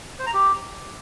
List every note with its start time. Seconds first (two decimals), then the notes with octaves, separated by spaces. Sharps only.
0.19 C5
0.26 A#5
0.34 G4